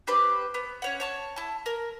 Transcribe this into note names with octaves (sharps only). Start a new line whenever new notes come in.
D4 G4 B4 C5
B3
C#4 C#5 F#5
C#5 A5 C#6
E4 A5
A#4